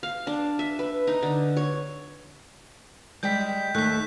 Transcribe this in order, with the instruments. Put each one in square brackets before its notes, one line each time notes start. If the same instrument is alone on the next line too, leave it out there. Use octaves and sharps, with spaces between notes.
[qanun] F5
D4
E5
B4
D#4
D3
C#5
[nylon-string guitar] G3 G#3 G4 [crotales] G6 B6
[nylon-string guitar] D#2 A3 [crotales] F#6 B6